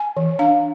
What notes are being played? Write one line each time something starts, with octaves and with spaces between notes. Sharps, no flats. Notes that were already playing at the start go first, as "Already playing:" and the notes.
Already playing: G#5
E3
D4 F5